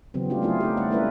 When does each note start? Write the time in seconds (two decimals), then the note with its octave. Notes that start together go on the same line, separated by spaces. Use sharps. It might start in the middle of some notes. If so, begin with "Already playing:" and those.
0.14 C#3 E3 F#3 B3 C4
0.30 G3 A3 D4 F4 G4
0.42 F#3 A3 C4 E4 F4 G#4
0.60 A3 D#4 G4
0.77 G3 A3 C4 D5 F#5
0.91 G#3 A#3 C#4 E4 A#4 B4